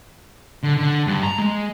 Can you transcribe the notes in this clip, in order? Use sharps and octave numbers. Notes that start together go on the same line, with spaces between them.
D3
D3
G2
A#5
G#3